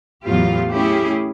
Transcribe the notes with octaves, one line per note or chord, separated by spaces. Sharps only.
E2 A2 F#3 B3 F4 G4
A3 C#4 E4 G4 G#4